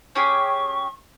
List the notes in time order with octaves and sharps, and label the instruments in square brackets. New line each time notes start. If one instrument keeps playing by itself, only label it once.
[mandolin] C#4 G4 G#4 [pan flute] C#6